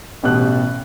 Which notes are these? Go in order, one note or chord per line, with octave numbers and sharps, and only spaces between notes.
A1 B2 G4 F#6